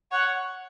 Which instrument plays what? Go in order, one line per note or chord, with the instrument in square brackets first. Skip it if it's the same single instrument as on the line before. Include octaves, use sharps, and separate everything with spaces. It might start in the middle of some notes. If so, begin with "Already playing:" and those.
[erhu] C#5 [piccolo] F#5